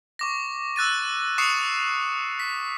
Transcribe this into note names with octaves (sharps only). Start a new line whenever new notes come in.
C#6 D6 A#6
E6 F#6 A6 D#7
C#6 D#6 C7 C#7 E7
B6